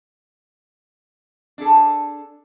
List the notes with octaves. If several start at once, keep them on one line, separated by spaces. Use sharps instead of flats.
D4 G#4 A4